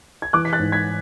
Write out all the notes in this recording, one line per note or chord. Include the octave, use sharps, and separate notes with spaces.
G#6
E3 D6 F#6
B6
F#6 A6
G#2
G#6 B6